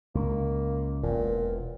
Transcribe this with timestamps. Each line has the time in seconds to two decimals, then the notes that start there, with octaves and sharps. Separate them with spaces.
0.15 C#2 A#3
1.03 E1 A#2 E3